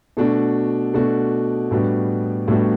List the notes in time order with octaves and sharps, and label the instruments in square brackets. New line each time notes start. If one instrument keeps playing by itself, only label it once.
[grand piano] B2 A3 D4 F#4
B2 A3 D4 F#4
A2 G3 B3 D4 F#4
A2 G3 B3 D4 F#4